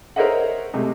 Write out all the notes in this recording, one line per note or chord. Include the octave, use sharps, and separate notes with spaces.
A#4 C5 C#5 D#5 E5 F#5
C3 G#3 A3